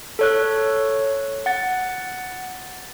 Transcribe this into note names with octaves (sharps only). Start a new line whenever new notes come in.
A4 C#5 F#6
F#5 A6